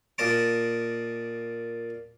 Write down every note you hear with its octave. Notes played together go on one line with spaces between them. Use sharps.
A#2 D#5 A5 D6